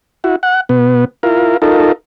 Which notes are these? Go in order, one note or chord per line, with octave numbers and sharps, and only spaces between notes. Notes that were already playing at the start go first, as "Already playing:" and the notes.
E4 F#4
F#5
B2 B3
E4 F4 A#4
D#4 F4 A4 A#4